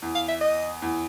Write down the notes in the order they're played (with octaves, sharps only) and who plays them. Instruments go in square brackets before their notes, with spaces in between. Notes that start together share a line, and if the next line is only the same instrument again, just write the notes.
[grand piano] E2
[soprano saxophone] F5
E5
D#5
[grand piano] E2